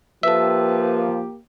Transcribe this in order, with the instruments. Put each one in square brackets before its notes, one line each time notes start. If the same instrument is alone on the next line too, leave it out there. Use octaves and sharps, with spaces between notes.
[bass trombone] F3 [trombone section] A#3 G4 [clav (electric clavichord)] A4 E5 [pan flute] B4